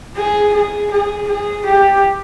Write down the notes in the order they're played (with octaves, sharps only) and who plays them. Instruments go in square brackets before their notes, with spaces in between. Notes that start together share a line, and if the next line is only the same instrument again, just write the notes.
[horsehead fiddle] G#4
G#4
G#4
G#4
G4